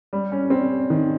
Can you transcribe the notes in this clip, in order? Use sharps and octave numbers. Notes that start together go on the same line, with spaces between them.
G3
C#4
C4
D#3